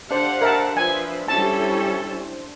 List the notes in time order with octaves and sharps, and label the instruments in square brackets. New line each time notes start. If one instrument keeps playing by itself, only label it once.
[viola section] D3 G4 F#5 [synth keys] D4 C5 [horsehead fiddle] F5
[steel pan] A#4 E5 A5
[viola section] F3 B4 [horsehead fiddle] E5 [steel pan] G#5
[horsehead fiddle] G3 C#4 [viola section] E4 A4 [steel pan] A5